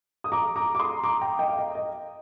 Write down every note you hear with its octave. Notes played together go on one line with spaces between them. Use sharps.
D#6
A#5 D6
A#5 D6
D6
C6 D#6
A#5 D6
G5 A#5
D#5 G5
F5
D#5
D#5